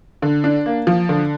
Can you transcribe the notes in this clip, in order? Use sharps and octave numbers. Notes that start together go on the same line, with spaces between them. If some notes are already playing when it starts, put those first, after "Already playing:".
D3
D4
A#3
F3
D3